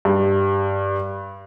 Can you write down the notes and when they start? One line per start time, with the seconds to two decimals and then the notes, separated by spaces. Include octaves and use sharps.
0.05 G2